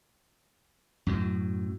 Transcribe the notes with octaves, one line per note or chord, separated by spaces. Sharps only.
F#2 A2 F#3